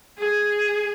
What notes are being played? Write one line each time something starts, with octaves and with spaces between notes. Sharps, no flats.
G#4